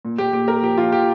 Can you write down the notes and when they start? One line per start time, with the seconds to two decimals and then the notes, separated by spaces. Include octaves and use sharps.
0.05 A#2
0.18 A#2 G4
0.33 A#2 G4
0.48 A#2 A#4
0.62 F3 G4
0.78 F3 F4
0.92 F3 G4